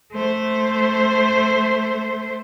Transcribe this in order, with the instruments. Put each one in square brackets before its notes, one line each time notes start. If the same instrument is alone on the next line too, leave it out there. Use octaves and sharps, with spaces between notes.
[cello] A3 C5